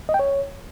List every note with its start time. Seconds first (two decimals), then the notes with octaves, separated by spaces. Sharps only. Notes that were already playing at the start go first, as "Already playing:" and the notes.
0.09 D#5
0.14 G5
0.19 C#5